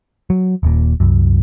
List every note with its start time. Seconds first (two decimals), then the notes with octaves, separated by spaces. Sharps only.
0.30 F#3
0.63 D#1 A#2
1.00 C2 F#2